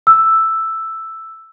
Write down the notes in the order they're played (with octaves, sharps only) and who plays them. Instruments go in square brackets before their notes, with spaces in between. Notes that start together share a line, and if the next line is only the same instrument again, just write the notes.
[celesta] E6